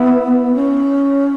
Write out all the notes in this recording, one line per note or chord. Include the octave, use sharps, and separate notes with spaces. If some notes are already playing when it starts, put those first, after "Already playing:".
Already playing: B3 E4
C#4